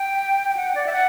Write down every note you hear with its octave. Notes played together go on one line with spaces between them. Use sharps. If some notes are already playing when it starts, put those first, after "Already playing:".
Already playing: G5
G5
F#5
D5
E5
F#5